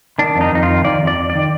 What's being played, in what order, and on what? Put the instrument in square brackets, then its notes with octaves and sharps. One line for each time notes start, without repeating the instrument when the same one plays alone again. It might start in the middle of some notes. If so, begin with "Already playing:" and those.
[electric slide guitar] D#3 D4
F2
D#4
F2 D#4
F4
D#3
D#3 D5
F2
D5
F2
D5
D#3